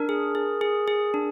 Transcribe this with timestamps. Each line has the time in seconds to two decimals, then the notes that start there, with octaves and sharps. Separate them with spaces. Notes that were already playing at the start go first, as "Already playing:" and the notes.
Already playing: D4 A#4
0.09 G#4
0.35 G#4
0.61 G#4
0.88 G#4
1.14 D4